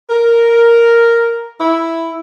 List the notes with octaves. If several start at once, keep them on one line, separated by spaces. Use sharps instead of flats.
A#4
E4